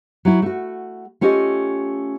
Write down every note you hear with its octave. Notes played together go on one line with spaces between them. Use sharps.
F#3 E4
A3 F#4
A3 C#4 F4 G4 D#5